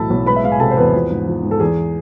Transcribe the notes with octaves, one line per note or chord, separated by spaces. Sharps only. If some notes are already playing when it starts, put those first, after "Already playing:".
Already playing: B1 A2 E3 A4 A5 B5
B1
G#3 B4 B5
E5
G#3 F5
G#5
C3 A4 A5
C5
E2 B3 B4
F3
G#2
F3
G#2
A4
E2 G#4